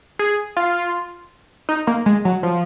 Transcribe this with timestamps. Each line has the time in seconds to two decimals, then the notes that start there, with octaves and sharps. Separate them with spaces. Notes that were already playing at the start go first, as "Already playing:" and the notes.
0.19 G#4
0.57 F4
1.69 D#4
1.87 A#3
2.06 G#3
2.25 F#3
2.43 F3